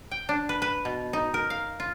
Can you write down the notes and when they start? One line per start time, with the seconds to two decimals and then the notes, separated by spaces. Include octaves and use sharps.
0.11 G5
0.29 D4
0.49 B4
0.62 B4
0.85 B2
1.13 D#4
1.34 A#4
1.50 F5
1.80 F4